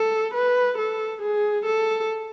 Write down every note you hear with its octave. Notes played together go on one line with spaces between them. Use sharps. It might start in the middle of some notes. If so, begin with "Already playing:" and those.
Already playing: A4
B4
A4
G#4
A4